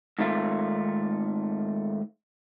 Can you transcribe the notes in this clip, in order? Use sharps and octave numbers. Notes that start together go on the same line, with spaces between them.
G#2 D#3 A3 F4